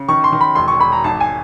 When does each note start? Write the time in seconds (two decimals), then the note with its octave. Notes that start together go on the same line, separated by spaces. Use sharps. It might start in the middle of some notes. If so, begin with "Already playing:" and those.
Already playing: C#3
0.09 D#3 C#6
0.24 C6
0.32 D#3
0.41 B5
0.55 E1 C6
0.68 C#6
0.80 E1 B5
0.92 A#5
1.04 G#1 A5
1.20 G#5